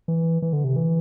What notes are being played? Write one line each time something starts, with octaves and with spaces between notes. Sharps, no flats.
E3
E3
D3
C3
E3